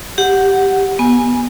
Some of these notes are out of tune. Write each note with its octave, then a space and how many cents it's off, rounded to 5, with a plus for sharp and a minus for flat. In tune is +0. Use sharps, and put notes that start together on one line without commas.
G4 +0 F#5 +0
B3 -25 G#5 +0